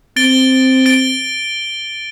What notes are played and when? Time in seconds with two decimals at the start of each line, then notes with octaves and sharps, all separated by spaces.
0.16 C4 A6 D7 G7
0.86 A6 D7 G7